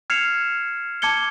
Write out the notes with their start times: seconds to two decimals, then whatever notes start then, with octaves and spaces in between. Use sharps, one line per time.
0.10 F6 G#6 C7 C#7 E7 F7
1.02 A5 D6 G#6 C#7 G7